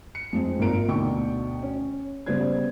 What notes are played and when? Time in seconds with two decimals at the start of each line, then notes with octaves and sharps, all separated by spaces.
0.15 C#7
0.33 F2 G#3 C4
0.59 G#1 A#2 F4 A#4 A#5 D7
0.88 D2 B2 D3 D#4 G5 C#6
1.62 C#4
2.26 C#3 G3 B3 C5 D5 G#6